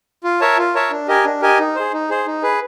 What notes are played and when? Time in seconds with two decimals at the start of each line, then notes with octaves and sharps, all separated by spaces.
0.24 F4
0.41 A#4 C#5 E5 A5
0.58 F4
0.74 A#4 C#5 E5 A5
0.91 D4
1.08 G4 A#4 D#5 G#5
1.25 D4
1.42 G4 A#4 D#5 G#5
1.59 D#4
1.75 G#4 C5
1.93 D#4
2.10 G#4 C5
2.26 D#4
2.42 G#4 B4